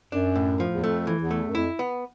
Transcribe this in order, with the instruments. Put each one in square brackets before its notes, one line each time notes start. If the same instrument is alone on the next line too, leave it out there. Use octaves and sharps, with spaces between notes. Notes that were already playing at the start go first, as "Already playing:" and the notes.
[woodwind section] F#2 [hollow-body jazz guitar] D4
[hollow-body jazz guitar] A2
F3
[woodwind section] E2
[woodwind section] F2 [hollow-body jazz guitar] A3
[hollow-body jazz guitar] E3
[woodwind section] E2
[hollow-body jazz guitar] A3
[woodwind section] F#2
[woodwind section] F2 [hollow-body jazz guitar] E4
[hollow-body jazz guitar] B3